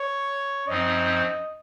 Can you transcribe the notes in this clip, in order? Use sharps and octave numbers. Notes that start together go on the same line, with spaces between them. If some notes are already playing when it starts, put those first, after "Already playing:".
Already playing: C#5
F#2 F3 C4 D#4 D#5